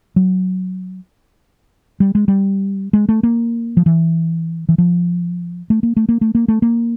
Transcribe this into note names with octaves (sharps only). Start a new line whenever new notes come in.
F#3
G3
G#3
G3
G#3
A3
A#3
F3
E3
E3
F3
A3
A#3
A3
A#3
A3
A#3
A3
A#3